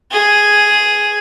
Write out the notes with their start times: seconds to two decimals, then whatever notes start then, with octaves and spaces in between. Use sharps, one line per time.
0.11 G#4